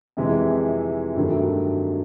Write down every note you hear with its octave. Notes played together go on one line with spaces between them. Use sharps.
F2 C3 E3 G#3
G2 D#3 F#3 A3